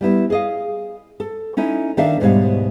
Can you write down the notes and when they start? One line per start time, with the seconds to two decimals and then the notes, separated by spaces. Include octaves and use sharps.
0.01 G3 B3 E4
0.30 G#4 D#5 F5
1.20 A4
1.57 C#4 D#4 E4
1.97 D#3 A#3 D4 A4 E5 F5
2.20 D2 G#2 B2 G3 C#5 F5